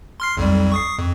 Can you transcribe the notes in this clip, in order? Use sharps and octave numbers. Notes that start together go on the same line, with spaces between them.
C6 F6 C7
B1 F2 G3
C#6 D#6 C7
F2